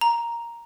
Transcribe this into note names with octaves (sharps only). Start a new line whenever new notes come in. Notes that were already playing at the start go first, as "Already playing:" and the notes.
A#5